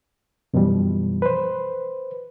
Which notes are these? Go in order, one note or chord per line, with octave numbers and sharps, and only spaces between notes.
F#2 B2 E3 F3 G3
B4 C5